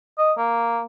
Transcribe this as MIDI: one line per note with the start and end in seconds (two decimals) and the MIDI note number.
0.18 0.33 75
0.38 0.82 58